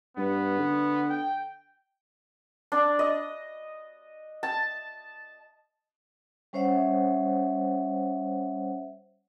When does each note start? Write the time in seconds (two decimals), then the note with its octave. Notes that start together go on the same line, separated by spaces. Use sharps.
0.17 G2 B3
0.59 D3
1.10 G5
2.72 D4
2.99 D#5
4.43 A5
6.53 G3 C#4 C5 C#5 E5 F#5